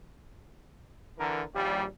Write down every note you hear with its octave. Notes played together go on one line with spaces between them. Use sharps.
D3 E3 A#4
A#1 D#2 G3